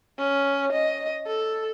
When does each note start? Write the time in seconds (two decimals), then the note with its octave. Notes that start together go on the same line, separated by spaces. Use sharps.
0.18 C#4
0.72 D#5
1.27 A4